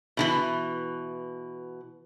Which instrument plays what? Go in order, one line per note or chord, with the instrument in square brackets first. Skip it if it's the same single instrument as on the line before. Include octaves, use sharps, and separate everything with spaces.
[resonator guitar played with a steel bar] B2 D#3 E3